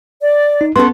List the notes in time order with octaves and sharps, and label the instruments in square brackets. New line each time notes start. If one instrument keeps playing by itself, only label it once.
[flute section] D5
[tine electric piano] D#4
[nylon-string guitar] B3 C#4 A4 [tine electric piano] C6